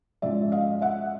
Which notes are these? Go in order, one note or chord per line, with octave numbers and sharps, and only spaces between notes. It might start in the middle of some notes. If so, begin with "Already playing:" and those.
G#2 F3 G#3 C#4 D5 E5
D#5 F5
E5 F#5